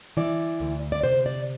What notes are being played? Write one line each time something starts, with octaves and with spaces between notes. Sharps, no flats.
E3 D5
D2
D5
C3 C5
D5